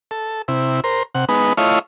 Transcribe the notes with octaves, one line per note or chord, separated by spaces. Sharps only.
A4
C3 E4
A#4 C5
C3 F#5
G#3 B3 D#4 B4
A3 E4 F4 C#5 D#5 F5